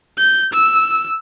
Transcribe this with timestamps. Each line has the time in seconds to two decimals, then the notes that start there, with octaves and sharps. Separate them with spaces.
0.18 G6
0.53 E6